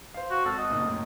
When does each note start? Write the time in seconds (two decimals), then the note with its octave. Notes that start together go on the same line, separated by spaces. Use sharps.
0.14 C5 F5
0.30 F#4
0.45 G#1 A4 F6
0.58 D#5
0.70 F#1 A#2 D#4
0.85 F#2 A2